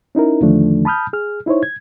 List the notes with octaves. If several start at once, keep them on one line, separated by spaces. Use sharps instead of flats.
C#4 D#4 E4 A#4
E2 D3 D#3 F3 A3 D4
A5 B5 D#6 F6 G6
G#4 F6
D#4 E4 C5 C#5
G#6